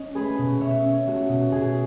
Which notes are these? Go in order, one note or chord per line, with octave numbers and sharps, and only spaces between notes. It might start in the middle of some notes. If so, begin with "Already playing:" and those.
Already playing: C#4 D#5
A3 G#4 B4
B2
B2 C#5 E5
C#4
A3 F#4
B2
B2 G#4